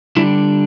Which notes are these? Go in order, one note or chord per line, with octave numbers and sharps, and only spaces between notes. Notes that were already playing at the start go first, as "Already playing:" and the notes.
D3 G3 D4 E4